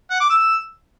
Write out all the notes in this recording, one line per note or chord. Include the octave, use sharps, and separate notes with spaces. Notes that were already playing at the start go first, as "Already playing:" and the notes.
F#5
D6
E6